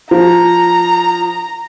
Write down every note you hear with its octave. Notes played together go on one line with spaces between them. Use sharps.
F3 A#5